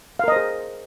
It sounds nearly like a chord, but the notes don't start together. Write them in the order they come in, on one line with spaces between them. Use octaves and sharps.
F5 A#4 D#5 C5 G#4